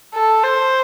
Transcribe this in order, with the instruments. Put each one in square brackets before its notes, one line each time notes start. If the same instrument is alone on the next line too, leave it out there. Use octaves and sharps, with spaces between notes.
[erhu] A4
C5